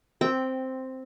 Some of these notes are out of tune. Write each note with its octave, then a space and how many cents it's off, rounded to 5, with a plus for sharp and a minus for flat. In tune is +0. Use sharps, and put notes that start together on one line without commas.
C4 +0 G5 -10